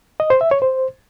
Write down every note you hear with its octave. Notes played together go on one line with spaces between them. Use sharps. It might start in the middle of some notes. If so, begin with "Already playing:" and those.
D#5
C5
E5
C#5
C5